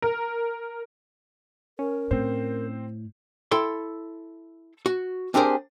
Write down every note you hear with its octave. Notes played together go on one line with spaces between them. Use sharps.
A#4
C#4 A#4
A2 C4 C5
E4 A4 G5 C6
F#4
C4 D4 G4 G#4 A#4 C5